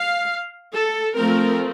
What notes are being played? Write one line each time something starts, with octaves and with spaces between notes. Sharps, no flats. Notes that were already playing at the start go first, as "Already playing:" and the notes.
Already playing: F5
A4
F3 A3 C4 A#4